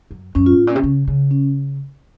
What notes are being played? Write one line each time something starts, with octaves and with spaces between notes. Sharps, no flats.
F#2
F#2 C#4
F4
A2
A#2 C#4
C3
C#3
C#3
C#4